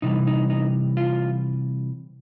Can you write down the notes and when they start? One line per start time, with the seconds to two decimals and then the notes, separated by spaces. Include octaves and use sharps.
0.02 C3 E3 G3 D#4
0.27 D#4
0.50 D#4
0.97 F4